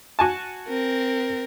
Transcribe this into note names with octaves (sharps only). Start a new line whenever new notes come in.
F#4 G#5 A5
C4 A#4